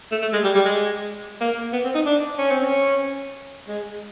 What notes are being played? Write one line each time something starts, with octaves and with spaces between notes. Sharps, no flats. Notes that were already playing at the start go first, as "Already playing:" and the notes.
A3
A3
G#3
G3
G3
G#3
A#3
B3
C4
D#4
D4
C#4
C4
C#4
G#3